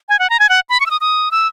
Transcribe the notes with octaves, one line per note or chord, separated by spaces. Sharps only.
G#5
F#5
A#5
G#5
F#5
B5
C#6
E6
D#6
D#6
E6